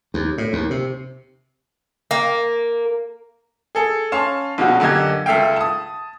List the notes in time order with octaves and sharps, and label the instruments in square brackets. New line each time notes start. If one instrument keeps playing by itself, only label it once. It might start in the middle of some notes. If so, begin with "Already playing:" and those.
[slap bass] D#2
A2
D#2
C3
[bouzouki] A#3
[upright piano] G#4 A4
C#4 F5 A5 C6
A#1 B2 G#3 F#4 F#5
F#2 D3 A#3 G4 D#5 G#6
C#2 A4 E5 F5 G5
A5 D#6